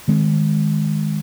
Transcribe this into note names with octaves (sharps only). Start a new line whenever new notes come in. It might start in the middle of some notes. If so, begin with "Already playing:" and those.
D#3 G#3 C4